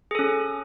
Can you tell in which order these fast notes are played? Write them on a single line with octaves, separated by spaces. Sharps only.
G#4 A4 C#4